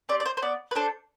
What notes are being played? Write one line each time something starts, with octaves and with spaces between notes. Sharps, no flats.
C4 G4 D5
D5
C5
C5
B3 D5
B4
D4 A4 C5